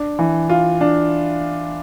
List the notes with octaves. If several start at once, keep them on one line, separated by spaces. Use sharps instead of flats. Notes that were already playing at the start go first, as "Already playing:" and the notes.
Already playing: D4
E3
F4
D4